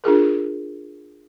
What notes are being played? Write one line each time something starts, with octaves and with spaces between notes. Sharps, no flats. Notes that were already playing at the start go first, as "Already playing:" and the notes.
D4 F4 G#4 A#4